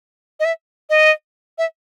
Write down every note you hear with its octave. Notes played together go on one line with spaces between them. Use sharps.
D#5
E5
D#5
E5